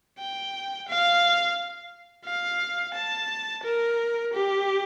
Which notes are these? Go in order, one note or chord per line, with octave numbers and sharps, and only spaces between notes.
G5
F5
F5
A5
A#4
G4